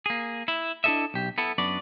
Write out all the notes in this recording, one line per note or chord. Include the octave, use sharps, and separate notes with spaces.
A#3 G#4
E4
D4 E4 F4 A4 D#5 E5
B1 G4
B3 E4 A4
F#2 B3 D4 F#4 B4 D5